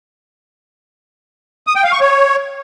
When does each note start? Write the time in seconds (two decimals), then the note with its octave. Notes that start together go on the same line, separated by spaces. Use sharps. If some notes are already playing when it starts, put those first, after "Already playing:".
1.67 D#6
1.75 G5
1.84 F5
1.92 C#6
2.01 C#5